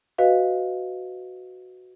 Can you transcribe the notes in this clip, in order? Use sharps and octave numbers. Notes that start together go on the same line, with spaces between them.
F#4 B4 D#5 F5